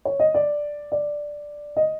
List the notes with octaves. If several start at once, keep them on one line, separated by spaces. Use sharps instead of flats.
C#5
D#5
D5
D5
D#5